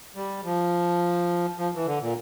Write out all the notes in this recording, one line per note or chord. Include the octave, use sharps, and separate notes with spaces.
G3
F3
F3
E3
D3
A#2